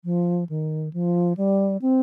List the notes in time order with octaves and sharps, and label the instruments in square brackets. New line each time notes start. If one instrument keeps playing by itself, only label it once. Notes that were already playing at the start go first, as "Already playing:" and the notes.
[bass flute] F3
D#3
F3
G3
C4